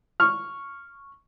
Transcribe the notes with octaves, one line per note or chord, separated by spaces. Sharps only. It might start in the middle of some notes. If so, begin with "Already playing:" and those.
C#6 F6